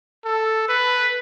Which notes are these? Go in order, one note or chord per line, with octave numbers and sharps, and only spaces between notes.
A4
B4